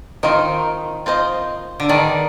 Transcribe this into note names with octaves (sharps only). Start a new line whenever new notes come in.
D#3 C4 F4 C5 D#5
C4 F4 C5 D#5
D3
D#3 B3 D4 G#4 D5